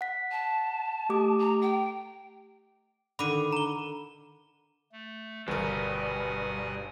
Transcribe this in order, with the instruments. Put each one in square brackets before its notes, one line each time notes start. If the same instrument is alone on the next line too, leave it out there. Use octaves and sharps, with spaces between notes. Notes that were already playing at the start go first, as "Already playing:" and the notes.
[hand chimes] F#5 B6
[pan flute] A5
[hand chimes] A3 G4 D6
[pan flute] A#5
G5
[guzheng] D3 D#3 [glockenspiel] B5 D6 D#7
[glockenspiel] A#5 G7
[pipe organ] A3
[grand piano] G1 A#4 [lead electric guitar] G2 [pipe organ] B2 F#5 G#5 [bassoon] B4